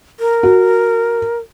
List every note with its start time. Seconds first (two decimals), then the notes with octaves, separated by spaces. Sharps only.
0.20 A#4
0.43 F#4